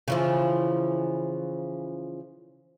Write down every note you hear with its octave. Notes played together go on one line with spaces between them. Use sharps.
C#3 E3 F3